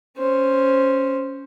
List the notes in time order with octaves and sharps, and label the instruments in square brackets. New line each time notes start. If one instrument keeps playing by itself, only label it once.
[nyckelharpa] C#4 C5